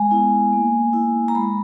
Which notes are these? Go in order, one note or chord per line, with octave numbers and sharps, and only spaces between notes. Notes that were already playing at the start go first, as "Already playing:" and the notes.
Already playing: G#3 G#5
B3 E4
A#3
E4
A#5
G#3 B5